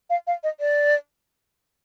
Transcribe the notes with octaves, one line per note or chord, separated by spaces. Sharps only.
F5
F5
D#5
D5